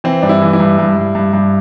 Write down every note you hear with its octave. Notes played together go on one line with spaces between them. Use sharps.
E3 C4
G2 D4
E4
E3
E4
G2
G2
G2
G2
G2